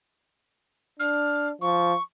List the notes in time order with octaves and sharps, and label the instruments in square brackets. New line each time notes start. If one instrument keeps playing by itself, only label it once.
[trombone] D4 [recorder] F6
[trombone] F3 [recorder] C#6